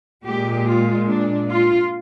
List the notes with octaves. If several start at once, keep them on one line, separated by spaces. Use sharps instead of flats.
A#2 G#3 G4
F4
D4
F4